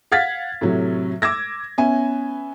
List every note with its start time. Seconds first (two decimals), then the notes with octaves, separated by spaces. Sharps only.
0.12 F5 F#5 F6 G#6 A6 B6
0.61 A2 C3 F#3
1.22 D6 E6 G#6 A#6
1.78 B3 C#4 E5 G#5